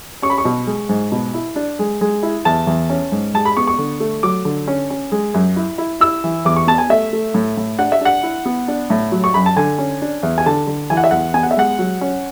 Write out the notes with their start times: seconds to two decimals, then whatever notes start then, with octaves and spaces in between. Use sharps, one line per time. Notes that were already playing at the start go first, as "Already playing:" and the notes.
0.22 C#4 C#6
0.30 B5
0.38 C#6
0.45 B2
0.67 G#3
0.89 G#2
1.12 B2
1.34 E4
1.56 D4
1.79 G#3
2.01 G#3
2.23 E4
2.45 E2 A5
2.67 E2
2.90 C#4
3.12 G#2
3.34 G#3 A5
3.45 B5
3.57 B3 C#6
3.67 C#6
3.78 D3
4.00 A3
4.23 F#3 D6
4.45 D3
4.68 C#4
4.90 C#4
5.12 G#3
5.34 F#2
5.56 E4
5.78 E4
6.00 E4 E6
6.24 E3
6.45 E2 D6
6.56 C#6
6.67 B3 A5
6.78 G#5
6.90 A3 E5
7.13 A3
7.34 A2
7.57 A2
7.78 D4 F#5
7.92 E5
8.01 D4 F#5
8.23 E4
8.46 B3
8.68 D4
8.90 A2
9.12 F#3
9.24 C#6
9.34 F#2 B5
9.46 A5
9.57 D3 G#5
9.78 C#4
10.02 D4
10.23 E2
10.38 G#5
10.46 D3 A5
10.67 D3
10.90 E3 G#5
10.97 F#5
11.04 E5
11.11 E2 F#5
11.34 B3 G#5
11.43 F#5
11.51 E5
11.57 G#3 F#5
11.79 F#3
12.01 C#4